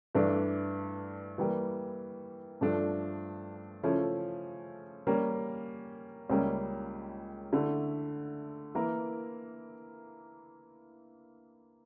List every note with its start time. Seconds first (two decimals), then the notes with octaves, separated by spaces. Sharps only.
0.15 G2 E3 A3 D4
1.38 E3 G3 A#3
2.61 G2 F3 A3 D4
3.83 C#3 F3 A3 C#4 E4
5.07 G3 A#3 C#4
6.30 C#2 C#3 G3 A#3 C#4
7.53 D3 A3 E4
8.75 E3 A#3 E4 A#4